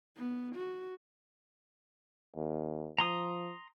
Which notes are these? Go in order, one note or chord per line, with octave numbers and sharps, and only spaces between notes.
B3
F#4
D#2
F3 A#5 C6 D#6